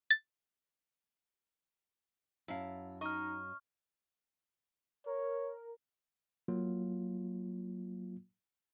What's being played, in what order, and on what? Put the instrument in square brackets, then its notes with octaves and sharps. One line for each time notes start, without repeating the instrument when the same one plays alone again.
[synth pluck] A6
[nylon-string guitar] F#2 A5 [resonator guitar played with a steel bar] E4 F5
[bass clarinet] D#4 [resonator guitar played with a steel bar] D#5 [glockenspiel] C#6 F6
[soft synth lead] A#4 [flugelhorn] C#5
[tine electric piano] F#3 A#3 F4